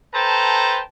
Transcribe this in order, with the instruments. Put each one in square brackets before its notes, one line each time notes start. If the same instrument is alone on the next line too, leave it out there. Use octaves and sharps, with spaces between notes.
[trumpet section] A4 B4 C5 G5 A5 A#5